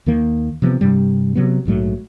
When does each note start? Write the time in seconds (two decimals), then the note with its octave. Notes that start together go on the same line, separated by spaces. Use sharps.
0.06 D#2 D#3 A#3
0.62 C3 F3 A#3 B3
0.81 G2 C3 G3
1.35 C3 F#3 B3
1.65 A#1 G#2 F#3 A3